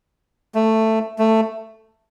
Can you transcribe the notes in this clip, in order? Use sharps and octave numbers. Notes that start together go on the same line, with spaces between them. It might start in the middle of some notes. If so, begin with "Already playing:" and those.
A3
A3